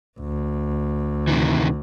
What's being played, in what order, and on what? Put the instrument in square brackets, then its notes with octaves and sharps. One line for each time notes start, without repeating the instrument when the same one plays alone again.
[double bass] D2
[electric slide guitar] C3 D#3 E3